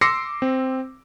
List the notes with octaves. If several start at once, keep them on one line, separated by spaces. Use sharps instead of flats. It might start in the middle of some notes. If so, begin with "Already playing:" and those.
C6 D6 E6 A#6 C7 C#7
C4